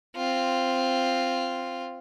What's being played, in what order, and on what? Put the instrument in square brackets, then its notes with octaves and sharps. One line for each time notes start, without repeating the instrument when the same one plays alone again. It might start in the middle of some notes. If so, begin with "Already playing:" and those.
[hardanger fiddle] C4 F4